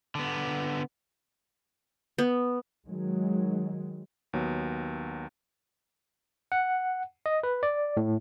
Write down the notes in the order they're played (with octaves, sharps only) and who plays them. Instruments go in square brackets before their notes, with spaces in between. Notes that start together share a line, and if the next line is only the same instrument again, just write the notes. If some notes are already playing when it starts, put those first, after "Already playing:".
[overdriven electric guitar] D3 B3
[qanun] B3
[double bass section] D#3 F#3 G#3
[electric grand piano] D#2 F#3 B3
[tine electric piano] F#5
D#5
B4
D5
A2